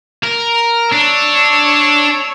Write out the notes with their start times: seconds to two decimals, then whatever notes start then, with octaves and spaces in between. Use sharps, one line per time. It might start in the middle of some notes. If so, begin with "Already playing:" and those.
0.23 A#4
0.92 D4 C#5 E6